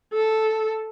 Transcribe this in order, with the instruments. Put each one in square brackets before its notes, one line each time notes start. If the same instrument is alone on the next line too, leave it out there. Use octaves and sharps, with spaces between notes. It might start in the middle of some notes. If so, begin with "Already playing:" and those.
[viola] A4